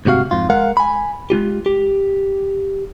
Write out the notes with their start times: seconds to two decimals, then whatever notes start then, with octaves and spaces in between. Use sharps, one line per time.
0.05 D2 G#2 C3 F#4 F5
0.31 F2 G#2 F4
0.50 G#3 A#4 F5 F#5
0.77 G#5 B5
1.30 G#3 A3 F4 G4
1.66 G4